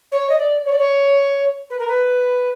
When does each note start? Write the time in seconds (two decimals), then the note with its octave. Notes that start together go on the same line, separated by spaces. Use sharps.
0.11 C#5
0.29 D#5
0.38 D5
0.65 C#5
0.72 D5
0.78 C#5
1.70 B4
1.79 A#4
1.87 B4